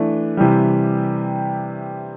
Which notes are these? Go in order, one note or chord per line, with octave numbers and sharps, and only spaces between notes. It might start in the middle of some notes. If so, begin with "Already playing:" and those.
Already playing: E3 A3 D4
C3 E3 G3